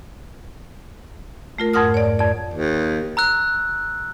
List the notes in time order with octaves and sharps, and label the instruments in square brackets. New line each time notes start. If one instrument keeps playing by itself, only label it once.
[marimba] A3 F4 A#4
F2 G#2 A#4 F#5 D#6 F6
C#5 D5
F2 D5
[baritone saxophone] D#2
[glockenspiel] A#5 E6 F#6